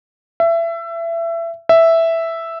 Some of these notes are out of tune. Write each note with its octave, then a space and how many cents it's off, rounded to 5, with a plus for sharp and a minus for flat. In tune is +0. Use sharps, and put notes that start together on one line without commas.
E5 +25
E5 +0